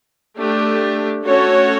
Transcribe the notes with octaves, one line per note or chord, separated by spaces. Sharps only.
A3 D4 G4
A3 C#4 F#4 A4 C#5